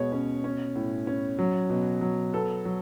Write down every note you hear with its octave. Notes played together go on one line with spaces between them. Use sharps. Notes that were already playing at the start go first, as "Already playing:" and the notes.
Already playing: B2 G#3 C#5
C#4
C#4
A2
C#4
F#3
B2
F#3
B3 A4
F#3